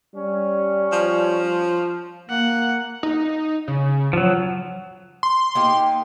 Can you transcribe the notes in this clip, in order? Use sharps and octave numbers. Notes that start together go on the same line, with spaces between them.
G3 C#4
F3
A#3 F#5
D#4
C#3
F3 F#3
C6
A#3 D#4 G4